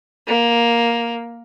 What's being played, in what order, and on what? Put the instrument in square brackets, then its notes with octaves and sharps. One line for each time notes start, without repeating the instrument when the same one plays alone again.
[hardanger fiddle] A#3